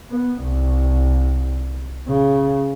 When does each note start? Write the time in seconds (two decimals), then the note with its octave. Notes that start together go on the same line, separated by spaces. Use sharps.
0.10 B3
0.44 C2
2.08 C#3